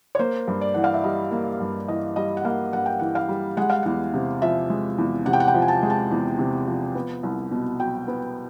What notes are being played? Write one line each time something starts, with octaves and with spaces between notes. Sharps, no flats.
C#5
A#3 C5
G2
D5
E3 F#5
F5
E5
G3 D#5
A#3
G2
E3 D#5
G3 D#5
F#5
A#3 F5
G2 F#5
G5
E3 F#5
F5
G3
G#3 F#5
F5
E2 F#5
C3
F3 E5
G#3
E2
C3 F#5
G5
F#5
G5
F3
G#5
A5
G#3
A5
E2
C3
F3
B3
C2
B2
F#3 G5
B3